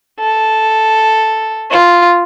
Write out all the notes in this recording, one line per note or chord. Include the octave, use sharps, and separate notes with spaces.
A4
F4